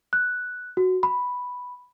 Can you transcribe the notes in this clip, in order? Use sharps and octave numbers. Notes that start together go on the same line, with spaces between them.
F#6
F#4
B5